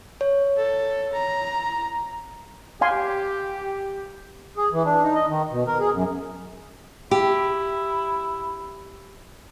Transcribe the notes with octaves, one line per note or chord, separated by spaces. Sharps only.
C#5
A4
A#5
G4 F5 G#5 C6
G#4
E3
D4
D#4
D#5
D#3
B2
A#4
G#4
F#2
E4 G4